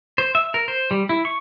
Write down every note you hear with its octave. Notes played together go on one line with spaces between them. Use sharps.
C5
E5
A#4
C5
G3
E4
C#6